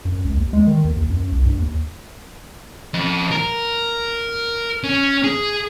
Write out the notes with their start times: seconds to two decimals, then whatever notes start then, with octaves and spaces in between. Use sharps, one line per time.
0.05 F#2
0.25 C#2
0.37 D#2
0.53 G#3
0.67 D#3
0.85 D#2
0.97 D#2
1.10 F#2
1.32 C2
1.46 G2
1.58 D#2
2.94 F3 D#5
3.31 A#4
4.84 C#4
5.24 G#4